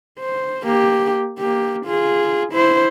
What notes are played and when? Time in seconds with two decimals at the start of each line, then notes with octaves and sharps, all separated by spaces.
0.19 C5
0.64 A#3 G4
1.39 A#3 G4
1.85 F4 G#4
2.52 E4 C5